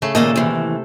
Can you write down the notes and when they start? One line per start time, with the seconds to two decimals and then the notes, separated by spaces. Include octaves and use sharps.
0.02 C#3 A3
0.15 D#2 A#2 A3 A#3 A4 D#5
0.36 D#2 C3 E3